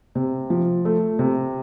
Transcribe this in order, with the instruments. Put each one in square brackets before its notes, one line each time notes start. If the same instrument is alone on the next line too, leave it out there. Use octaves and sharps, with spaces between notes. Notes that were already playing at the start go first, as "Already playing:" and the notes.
[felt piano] C3
F3
A3
C3